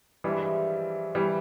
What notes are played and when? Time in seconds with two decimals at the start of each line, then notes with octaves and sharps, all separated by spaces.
0.24 G2 E3 F3 G3 G#3 E4
1.15 E3 G3